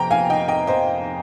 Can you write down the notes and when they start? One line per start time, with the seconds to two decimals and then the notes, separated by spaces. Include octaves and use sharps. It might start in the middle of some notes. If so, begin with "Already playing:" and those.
Already playing: F2 C3 G5 A#5
0.11 F5 G#5
0.30 D#5 G5
0.48 D#5 G5
0.67 C5 D#5